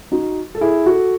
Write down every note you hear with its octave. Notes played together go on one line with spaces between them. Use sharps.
D#4 F#4
A4
E4 G#4
F#4 A4